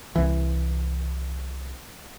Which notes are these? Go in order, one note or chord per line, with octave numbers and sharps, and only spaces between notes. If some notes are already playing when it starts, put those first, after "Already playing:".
C2 E3